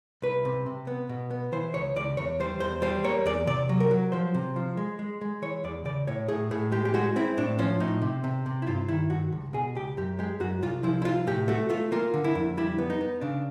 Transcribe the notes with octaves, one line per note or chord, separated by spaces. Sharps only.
C2 B4
C3
C3
B3
B2
B3
E3 C5
C#2 C#5
C#2 D5
E2 C#5
G3 C5
E2 C5
G3 C5
A#3 C#5
E2 D5
C3 D5
F#3
A#4
F#3
F3 C5
C3
F3
G#3
G#3
G#3
E3 C#5
E2 D5
C#3 D5
A2 C#5
A2 G#4
A2 G#4
G#3 G4
G4
G#3 F#4
C4 E4
A2 D4
F3 C#4
A2 D#4
C3
C3
C3
E4
G2 F4
D#3 E4
G2 F#4
C#2
B2 G#4
C#2 G4
F#2 G4
G#3 G4
F#2 F#4
C2 F4
F3 E4
E4
C2 F4
A2 G4
A3 F#4
A3 F4
A#3 F4
D3
E4
F2
G3 E4
B3
D#4
B3
C#3 D4